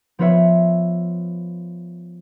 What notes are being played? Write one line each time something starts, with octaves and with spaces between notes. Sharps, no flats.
F3 B3 F4 B4 C#5 E5